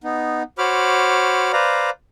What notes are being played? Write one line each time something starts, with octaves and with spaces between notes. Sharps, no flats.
B3 D#4
F#4 C5 C#5 B5 D6 F6
B4 C5 D5 F5 A#5